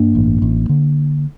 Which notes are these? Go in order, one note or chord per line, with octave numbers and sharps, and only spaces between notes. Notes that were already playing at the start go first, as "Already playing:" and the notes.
Already playing: G2 A#3 D4
A1
A1
D3